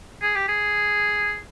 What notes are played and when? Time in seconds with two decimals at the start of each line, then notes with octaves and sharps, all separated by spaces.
0.22 G#4
0.35 G4
0.48 G#4